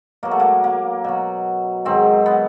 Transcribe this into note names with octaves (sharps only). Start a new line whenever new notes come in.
B2 F#3 A#3
A3
A#3
A#3
B2 F#3
G#2 D#3 F#3 C4
B3